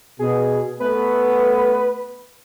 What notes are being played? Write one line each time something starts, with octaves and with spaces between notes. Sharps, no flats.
B2 G#4
A3 B3 B4